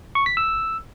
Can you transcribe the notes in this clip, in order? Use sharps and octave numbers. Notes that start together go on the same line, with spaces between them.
C#6
B6
E6